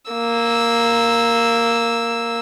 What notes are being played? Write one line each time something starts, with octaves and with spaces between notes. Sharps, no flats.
A#3 E6